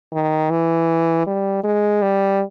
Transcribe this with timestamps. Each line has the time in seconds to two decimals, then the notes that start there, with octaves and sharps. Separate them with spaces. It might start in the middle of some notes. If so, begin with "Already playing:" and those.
0.13 D#3
0.50 E3
1.27 G3
1.64 G#3
2.02 G3